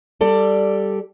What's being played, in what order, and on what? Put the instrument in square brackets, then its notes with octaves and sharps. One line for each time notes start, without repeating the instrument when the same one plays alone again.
[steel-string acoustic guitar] G3 A4 D5